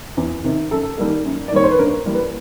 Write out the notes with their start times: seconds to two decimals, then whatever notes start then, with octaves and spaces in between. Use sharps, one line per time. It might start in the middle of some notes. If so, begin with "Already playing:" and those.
0.17 E2
0.44 C3 D#3
0.71 F#2 A4
0.98 D#3 G3 A#3
1.25 F#2
1.48 D5
1.52 D#3 G3 A#3 C#5
1.64 C5
1.71 B4
1.79 G2 A#4
2.05 E3 G3 A#3
2.14 B4